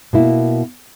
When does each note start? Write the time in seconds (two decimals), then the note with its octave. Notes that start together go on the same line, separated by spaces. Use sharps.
0.13 B2 A#3 E4